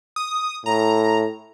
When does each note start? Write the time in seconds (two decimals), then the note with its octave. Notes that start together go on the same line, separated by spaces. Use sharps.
0.16 D#6
0.66 A2 A#5